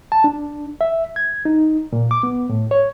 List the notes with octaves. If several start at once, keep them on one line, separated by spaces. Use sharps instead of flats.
A5
D4
E5
G#6
D#4
A#2
D6
B3
A2
C#5